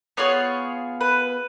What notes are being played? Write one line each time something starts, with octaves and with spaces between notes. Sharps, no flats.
B3 F4 G#4 C#5
B4